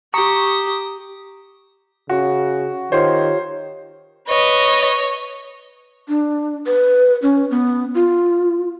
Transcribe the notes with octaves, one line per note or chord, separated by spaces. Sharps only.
G4 A#5 C#6 D#6
C#3 F#4
D#3 F4 G4 C5 C#5
B4 C#5 D#5
D4
B4
C#4
B3
F4